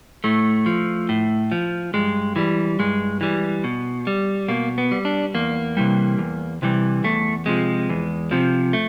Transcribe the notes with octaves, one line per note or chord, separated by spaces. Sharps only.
A2 A3
F3
A2
F3
G2 G#3
E3 G3
G2 G#3
E3 G3
B2
G3
B2 A#3
B3
G3
D4
E2 A#3
C3 E3 G3
E2
C3 E3 G3
E2 A3
C3 F3 G#3
E2
C3 F3
A3